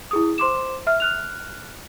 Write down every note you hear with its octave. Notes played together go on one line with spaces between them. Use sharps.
E4 G#4 D#6
C5 C6 D6 E7
E5 F6
F6 F#6 F7